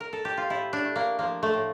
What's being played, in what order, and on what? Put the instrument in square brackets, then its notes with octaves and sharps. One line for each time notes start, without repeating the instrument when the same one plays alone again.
[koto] A#4
A4
G4
F4
A2 E4
D4
A3
A#3
F3 A#3
A3
A2